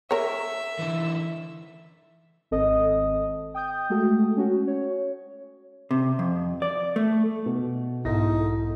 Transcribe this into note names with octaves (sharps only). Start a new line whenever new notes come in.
A#4 C#5 E5
D3 E3
G#1 C4 A4 D#5 D#6
G5 D#6 G6
G#3 A3 F#4 A4
C#4 F#4
C#5
C3
F2
D5
A3
B2
B1 G#2 D#4 E4 A4 A#6